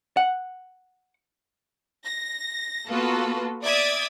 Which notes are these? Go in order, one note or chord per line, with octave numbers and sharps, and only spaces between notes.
F#5
A#6
A#3 B3 F4 F#4 A4 B4
D5 E5 D6 D#6 G#6 A6